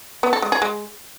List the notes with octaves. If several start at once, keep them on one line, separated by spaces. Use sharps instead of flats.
B3
A4
G#3
G#4
G#3